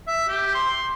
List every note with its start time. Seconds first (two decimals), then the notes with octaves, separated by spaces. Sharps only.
0.07 E5
0.28 G4
0.55 C6